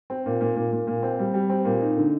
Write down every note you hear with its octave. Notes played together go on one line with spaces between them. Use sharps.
C4
A#2
A#2
A#2
A#2
A#2
C4
G3
G3
C4
A#2
D#4
D3